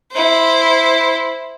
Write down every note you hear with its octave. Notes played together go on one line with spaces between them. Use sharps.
E4 C5